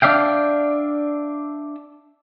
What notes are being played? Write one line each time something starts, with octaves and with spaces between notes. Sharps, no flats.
D4 D5 E5 F5 G5